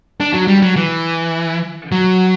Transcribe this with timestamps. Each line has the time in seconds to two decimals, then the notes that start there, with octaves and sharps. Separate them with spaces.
0.20 D4
0.34 F#3
0.48 G3
0.62 F#3
0.76 E3
1.92 F#3